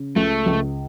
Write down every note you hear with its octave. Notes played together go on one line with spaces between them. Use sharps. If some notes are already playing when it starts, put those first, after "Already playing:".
Already playing: C#3
C#2 A3
C#2